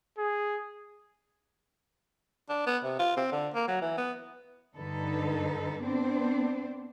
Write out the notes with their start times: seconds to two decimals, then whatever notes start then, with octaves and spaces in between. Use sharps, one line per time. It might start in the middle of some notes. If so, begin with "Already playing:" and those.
0.18 G#4
2.49 D4
2.66 B3
2.84 C3
2.99 F4
3.17 C4
3.32 D3
3.54 A#3
3.68 F#3
3.82 E3
3.98 B3
4.77 G2 D3 D#4 A4 B4
5.82 B3 C4 D4 C5